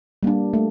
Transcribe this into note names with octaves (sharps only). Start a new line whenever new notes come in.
G3 A#3 D4
A3